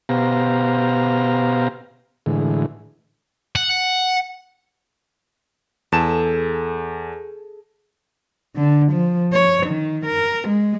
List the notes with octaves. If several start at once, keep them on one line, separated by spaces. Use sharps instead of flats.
B2 B3 G4 C5 F5 A#5
A2 D3 E3 G#3
F#5
E2 G#4 A4 A5 E7
D3
F3
C#5
D#3
A#4
G#3